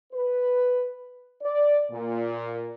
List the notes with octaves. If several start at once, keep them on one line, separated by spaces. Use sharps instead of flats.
B4
D5
A#2